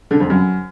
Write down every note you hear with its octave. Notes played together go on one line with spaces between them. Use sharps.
D3
F2
F#2